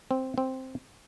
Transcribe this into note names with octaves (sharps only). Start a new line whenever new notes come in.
C4
C4